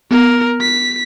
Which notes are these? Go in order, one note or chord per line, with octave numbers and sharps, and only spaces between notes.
B3 A#4
B6